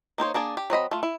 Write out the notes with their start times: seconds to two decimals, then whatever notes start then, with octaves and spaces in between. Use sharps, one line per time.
0.18 A#3 D#4 C5 C#5
0.34 A#3 D4 G#4 D5
0.57 G4
0.70 F#3 C4 D#5 B5
0.91 A3 F4
1.03 E4